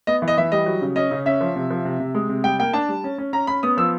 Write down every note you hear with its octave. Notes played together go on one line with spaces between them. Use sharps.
B3 D#5
E3
D#5
E3 E5
G3 D#5
F#3
C#3
C#4 D#5
C#3
C#4 E5
F3
C3
F3
C3
C3
G#3
C3
G3 G5
A#3 G5
D4 A5
G3
C#4
C#4
C#4 A#5
C#4 B5
B3 D#6
F3 E6